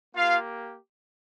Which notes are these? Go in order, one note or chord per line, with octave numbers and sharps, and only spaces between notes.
A#3 F4 G4 F5